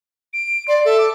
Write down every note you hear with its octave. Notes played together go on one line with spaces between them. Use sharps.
D7
D5 C6
A4 E5
D6